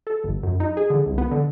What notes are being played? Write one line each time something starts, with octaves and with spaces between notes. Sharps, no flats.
A4
G1
F#2
D#4
G#4
D3
C2
B3
D3